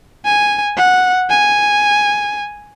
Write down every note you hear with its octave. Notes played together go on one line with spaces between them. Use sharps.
G#5
F#5
G#5